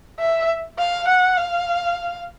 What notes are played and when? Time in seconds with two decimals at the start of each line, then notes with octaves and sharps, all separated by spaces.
0.20 E5
0.79 F5
1.08 F#5
1.38 F5